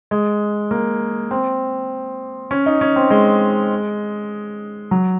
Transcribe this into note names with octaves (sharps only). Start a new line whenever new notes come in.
G#3
A#3
C4
C#4
D#4
C#4
C4
G#3
F#3